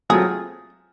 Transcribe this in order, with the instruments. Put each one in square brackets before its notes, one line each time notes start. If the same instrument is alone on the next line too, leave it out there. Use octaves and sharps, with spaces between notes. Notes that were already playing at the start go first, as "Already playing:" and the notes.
[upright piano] F#3 A3 C4 F4 [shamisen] G#4